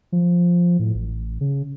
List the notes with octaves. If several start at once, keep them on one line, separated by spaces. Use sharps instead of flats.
F3
A2
A1
C#3